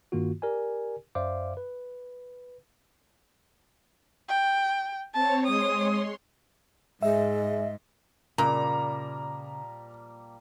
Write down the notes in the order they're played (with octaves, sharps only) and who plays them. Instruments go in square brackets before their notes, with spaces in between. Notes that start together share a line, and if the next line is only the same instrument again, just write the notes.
[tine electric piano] G2 D#3 A#3 F4 F#4
G4 A#4 D5 G#5
F#2 C5 D5 E5 F5 D6
B4
[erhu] G5
[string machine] C4 C#5 [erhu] A5
[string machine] G#3 C#5 C6 [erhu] D#6
[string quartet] G#2 [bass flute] G#3 [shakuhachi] D#5 [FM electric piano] E5
[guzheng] A#2 [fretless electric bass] C#3 [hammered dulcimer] F3 G3 A#3 [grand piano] A#5